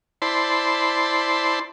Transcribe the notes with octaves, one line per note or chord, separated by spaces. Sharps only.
E4 C5 D5 A5 B5 C6